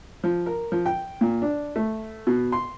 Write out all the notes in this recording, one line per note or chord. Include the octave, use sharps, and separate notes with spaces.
F3
A#4
F3
G5
A#2
D4
A3
B2
C6